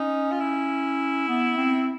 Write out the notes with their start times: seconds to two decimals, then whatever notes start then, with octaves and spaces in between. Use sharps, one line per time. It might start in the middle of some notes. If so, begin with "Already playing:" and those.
Already playing: C#4 D#4
0.32 F4
0.40 E4
1.29 B3
1.57 C4